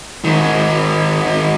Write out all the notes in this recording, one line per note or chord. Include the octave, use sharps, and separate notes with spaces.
G#2 D#3